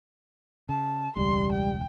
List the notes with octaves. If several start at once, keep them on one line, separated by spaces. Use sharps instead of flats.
C#3 A5
E1 C#2 G3 C6
G5